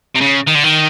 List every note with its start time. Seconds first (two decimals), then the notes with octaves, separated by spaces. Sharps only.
0.15 C3
0.21 C#3
0.48 D#3
0.55 D3
0.64 D#3